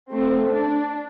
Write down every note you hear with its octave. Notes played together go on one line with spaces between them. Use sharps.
A3 C4
D4